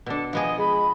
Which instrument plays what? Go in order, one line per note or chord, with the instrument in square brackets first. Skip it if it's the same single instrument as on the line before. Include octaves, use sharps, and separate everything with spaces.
[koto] B2 D4 [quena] A4
[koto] F3 B3 G#4 [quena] D#5
[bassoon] G#3 [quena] B5